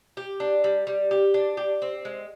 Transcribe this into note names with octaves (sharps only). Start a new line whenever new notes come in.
G4
D4
G3
G3
G4
D4
G4
C4
G#3